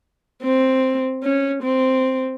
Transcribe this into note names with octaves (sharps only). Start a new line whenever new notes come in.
C4
C#4
C4